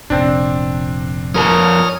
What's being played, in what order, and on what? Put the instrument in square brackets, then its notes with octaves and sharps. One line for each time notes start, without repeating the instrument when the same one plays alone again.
[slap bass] F1 A#2 [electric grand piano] C4 D4
[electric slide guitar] F2 A#4 A5 [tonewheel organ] C#5 D#6 F6